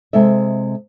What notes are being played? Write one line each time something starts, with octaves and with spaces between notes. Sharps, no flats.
C3 G#3 A4 E5